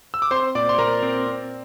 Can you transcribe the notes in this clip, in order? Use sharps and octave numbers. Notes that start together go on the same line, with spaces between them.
E6
D6
C4 C5 C6
A#2 D5 D6
C6
A#2 A#4 A#5
C4
C4